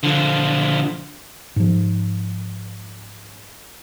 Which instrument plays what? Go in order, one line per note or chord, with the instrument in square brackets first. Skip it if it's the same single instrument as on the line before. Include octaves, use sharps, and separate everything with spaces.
[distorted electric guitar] D3 F3
[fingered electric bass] G#2 F3